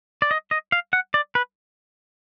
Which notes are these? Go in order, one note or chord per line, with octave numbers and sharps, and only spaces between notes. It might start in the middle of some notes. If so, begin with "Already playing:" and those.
D5
D#5
D#5
F5
F#5
D5
B4